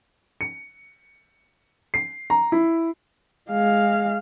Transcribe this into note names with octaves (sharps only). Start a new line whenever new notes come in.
C#7
C7
A#5
E4
G#3 F5